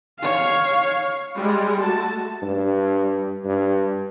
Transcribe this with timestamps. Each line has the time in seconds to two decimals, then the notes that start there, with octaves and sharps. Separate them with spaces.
0.19 C#5 F5
1.36 G3 G#3
1.81 A3 F#4 A5
2.42 G2
3.44 G2